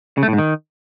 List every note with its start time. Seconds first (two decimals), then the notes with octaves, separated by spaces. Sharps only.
0.18 C#3
0.23 A3
0.28 A2
0.33 G#2
0.38 D#3